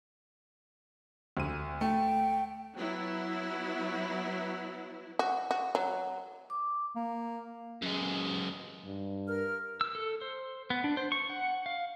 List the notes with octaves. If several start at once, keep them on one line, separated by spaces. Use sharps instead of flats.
D2 D#7
A3 G5
F#3 B3 E4
F#4
F#4
F#3
D6
A#3
F#2 G#3
G2
A#4 F6
E6
A4
C5
B3
D4
C5
C#6
F#5
F5